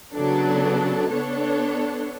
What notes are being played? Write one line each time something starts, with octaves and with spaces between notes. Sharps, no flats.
C#3 F#3 B3 D4 A4
B3 D4 A4 C#5